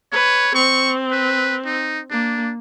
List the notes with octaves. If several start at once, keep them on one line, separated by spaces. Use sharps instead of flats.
B4 C#5
C4 C#6
B4
D#4
A#3 D4